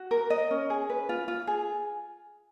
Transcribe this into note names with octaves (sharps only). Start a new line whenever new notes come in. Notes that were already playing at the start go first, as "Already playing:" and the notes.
Already playing: F#4
A#4
D#5
C#4
G#4
B4
F4
F4
G#4